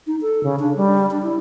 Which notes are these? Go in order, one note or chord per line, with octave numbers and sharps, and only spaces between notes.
D#4
A4
C#3
D4
G3
D4
E4